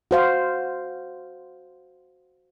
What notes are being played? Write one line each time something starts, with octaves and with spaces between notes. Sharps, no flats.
F#4 C5 F5